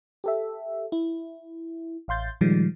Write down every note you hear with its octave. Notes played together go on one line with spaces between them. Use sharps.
G4 A4 E5
E4
A1 F5 C6 G6 A6
A#2 D#3 F3 G3 G#3